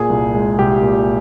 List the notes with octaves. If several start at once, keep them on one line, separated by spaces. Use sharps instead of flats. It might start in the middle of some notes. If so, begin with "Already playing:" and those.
Already playing: A#2 G#4
C2
G#3
C2 G4
A#2